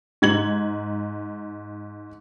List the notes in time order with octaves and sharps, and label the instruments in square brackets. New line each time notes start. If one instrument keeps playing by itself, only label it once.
[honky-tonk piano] G#2 G#6 F#7